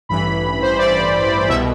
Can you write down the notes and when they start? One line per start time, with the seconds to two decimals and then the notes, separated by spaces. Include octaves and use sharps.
0.09 A1 G2 E3 B5
0.62 C5
0.78 D5
1.48 C2 B2 E5